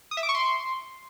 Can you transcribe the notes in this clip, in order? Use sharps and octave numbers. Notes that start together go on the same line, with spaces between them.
D#6
E5
D6
C#6
C6